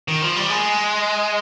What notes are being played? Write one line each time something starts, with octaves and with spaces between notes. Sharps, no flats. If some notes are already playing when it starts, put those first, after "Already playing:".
D#3
F3
G3
G#3